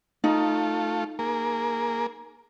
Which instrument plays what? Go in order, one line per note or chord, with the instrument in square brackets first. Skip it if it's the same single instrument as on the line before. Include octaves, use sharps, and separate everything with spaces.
[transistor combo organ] A3 F4 A4 [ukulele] D#4
[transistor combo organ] A#3 G#4 A#4